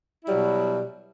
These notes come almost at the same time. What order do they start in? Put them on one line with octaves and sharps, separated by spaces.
E4 G3 F#3 B2